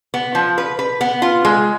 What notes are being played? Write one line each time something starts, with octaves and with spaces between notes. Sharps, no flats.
B3
F3
B4
B4
B3
F4
G#3